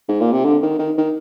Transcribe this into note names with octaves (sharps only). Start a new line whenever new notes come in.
G#2
A#2
C3
D3
D#3
D#3
D#3